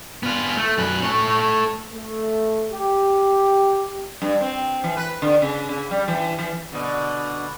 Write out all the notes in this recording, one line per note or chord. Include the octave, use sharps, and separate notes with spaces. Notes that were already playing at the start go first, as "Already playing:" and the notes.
B3 F4
A3
F#2 B4
A3 C#5
A3
G4
G2
C4
E3
B4
D3
C#3
C#3
G3
E3
E3
B2 D3